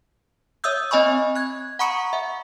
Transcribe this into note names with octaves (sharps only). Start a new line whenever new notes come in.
C#5 E5 D#6 E6 G6
C4 D#5 G#5 B5 C#6
F#6 G#6
F#5 A#5 B5 C#6 D#6 C#7
E5 F#5